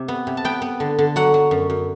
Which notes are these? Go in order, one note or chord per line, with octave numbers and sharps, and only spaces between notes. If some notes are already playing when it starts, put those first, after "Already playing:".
Already playing: C3
B3
C3
A5
B3 G5
B3
D3
D3
F#3 F#5
F#3
F#2
F#2